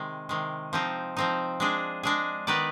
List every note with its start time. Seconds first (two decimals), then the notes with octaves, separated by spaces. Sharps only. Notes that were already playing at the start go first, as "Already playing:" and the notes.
Already playing: C3 D#3 G#3
0.29 C3 D#3 G#3
0.73 F3 C4 D#4
1.17 F3 C4 D#4
1.60 G#3 D4 G#4
2.03 G#3 D4 G#4
2.47 D#3 B3 D#4 B4 D5